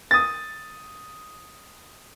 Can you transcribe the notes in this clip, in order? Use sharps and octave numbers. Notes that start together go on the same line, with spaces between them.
D#6 A6